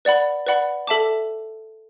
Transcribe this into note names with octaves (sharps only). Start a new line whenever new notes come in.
B4 D5 F#5 B5
B4 D5 F#5 B5
A4 E5 A5 D6